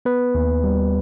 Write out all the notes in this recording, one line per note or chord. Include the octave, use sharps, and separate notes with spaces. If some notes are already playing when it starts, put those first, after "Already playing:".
B3 B4
D#2
G3